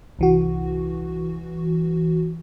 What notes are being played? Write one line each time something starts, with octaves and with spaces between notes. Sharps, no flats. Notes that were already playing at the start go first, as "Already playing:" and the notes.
C2 E3 F#4